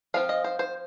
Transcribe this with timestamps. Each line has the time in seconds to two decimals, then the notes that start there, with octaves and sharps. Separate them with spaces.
0.14 F3 C4 F4 F5
0.29 D#5
0.44 C5
0.59 C5